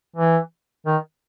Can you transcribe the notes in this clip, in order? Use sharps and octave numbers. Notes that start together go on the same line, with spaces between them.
E3
D#3